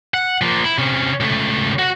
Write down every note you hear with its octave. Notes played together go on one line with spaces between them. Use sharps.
F#5
F3 A#3
E4
C3 C#4
C#2 A3
F#4 F#5